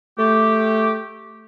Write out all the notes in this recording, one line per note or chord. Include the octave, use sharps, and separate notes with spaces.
A3 G4